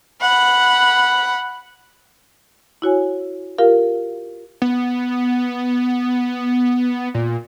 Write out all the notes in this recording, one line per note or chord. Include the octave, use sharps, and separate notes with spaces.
F#5 B5
E4 F#4 C#5 G#5
F4 G4 A#4 F5
B3
A#2